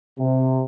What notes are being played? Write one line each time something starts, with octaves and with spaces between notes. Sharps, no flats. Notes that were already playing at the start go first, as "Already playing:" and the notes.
C3